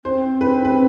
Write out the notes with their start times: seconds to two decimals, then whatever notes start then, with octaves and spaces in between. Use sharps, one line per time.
0.05 C4 C5
0.41 B4
0.65 B4